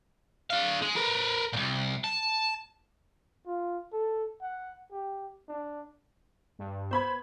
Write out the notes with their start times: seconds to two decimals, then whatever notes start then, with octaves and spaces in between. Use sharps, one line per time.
0.50 D4 F5
0.82 G#3
0.96 A#4 B4
1.53 C2 A#2
2.04 A5
3.46 F4
3.92 A4
4.42 F#5
4.91 G4
5.48 D4
6.59 G2
6.91 B3 C5 B5 G#6